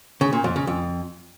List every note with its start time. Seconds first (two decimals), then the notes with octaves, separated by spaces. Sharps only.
0.21 C#3
0.33 A#2
0.44 F2
0.56 C#3
0.67 F2